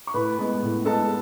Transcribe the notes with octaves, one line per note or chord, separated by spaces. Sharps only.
C#6
A2 B4 B5
G#3 B3
A2
G#3 B3 A4 A5